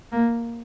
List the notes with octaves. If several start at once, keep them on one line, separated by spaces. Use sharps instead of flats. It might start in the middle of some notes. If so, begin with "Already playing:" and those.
A#3